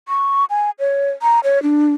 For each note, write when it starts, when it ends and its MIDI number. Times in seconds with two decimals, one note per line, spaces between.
0.08 0.45 85
0.50 0.70 80
0.79 1.11 73
1.22 1.40 82
1.44 1.62 73
1.63 1.94 62